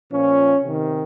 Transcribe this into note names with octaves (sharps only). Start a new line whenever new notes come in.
A#2 F3 C#4
C3 D#3